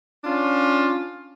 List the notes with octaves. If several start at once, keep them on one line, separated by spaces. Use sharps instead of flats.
C#4 D4 F4